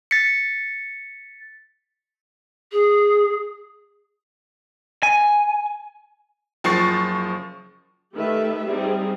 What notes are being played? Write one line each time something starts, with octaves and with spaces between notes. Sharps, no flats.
A6 B6 C#7
G#4
G#5
F#1 F3 C#6 A6 C7
D#3 A3 G4 A4 B4 E5
G3 C4 D#4 G#4